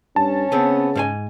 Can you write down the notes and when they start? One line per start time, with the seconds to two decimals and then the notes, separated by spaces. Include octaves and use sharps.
0.16 G2 C#4 A5
0.52 C#3 B3 C4
0.95 G#2 C5 G#5